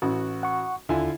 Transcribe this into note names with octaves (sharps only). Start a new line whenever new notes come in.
A1 F#4
F#5 C#6
D#2 D3 E4 F4 G#5